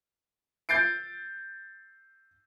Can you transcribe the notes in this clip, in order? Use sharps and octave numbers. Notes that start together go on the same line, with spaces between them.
G6 A6 C7 D7